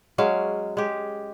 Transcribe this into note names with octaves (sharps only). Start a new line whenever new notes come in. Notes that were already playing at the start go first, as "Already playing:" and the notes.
F#3 G#3 C#4 F5
G#3 G4